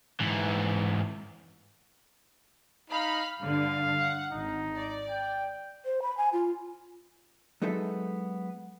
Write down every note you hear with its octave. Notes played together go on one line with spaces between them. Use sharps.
G#2 E3
D#4 F5 B5 F6
G2 D3 F5
F#5
G#1 D#4
D5
G5
C5
B5
G#5
F4
F#3 G#3 B3 D#4 A4 E5